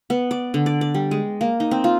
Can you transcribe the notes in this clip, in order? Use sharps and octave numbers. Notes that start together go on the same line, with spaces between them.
B3
D5
D3
D5
D5
G3
G#3
A#3
D#4
C4
F4